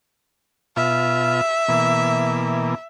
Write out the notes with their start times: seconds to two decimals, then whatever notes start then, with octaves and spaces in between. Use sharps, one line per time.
0.76 B2 F4 E5
1.68 B2 E3 A#3